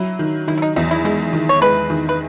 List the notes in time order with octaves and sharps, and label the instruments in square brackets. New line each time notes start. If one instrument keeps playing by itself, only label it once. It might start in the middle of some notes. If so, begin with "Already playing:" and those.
Already playing: [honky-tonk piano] F#3 [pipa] E4
[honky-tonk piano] D#3
[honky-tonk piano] D#3 [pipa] E4
[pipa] E4
D#4
[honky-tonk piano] E2 [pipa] D#4
[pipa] E4
[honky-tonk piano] G#3 [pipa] E4
[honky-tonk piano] D#3
[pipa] C#5
[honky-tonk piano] G#3 [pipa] B4
[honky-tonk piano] D#3
[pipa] B4